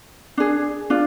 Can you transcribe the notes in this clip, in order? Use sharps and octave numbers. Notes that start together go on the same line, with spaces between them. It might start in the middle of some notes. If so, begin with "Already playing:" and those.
D4 G#4
D4 F4